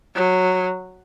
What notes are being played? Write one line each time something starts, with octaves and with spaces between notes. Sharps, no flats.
F#3